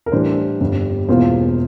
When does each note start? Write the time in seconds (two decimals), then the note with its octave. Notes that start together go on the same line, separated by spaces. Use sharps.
0.06 A#4
0.12 A2 E3 G3 D4 C5
0.60 G1 F2 C3 G3
1.09 E1 E2 E3 A#3 F4 C5